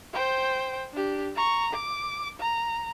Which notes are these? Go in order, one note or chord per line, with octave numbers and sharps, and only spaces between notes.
C5 G5
D4 G4
A#5 C#6
D6
A#5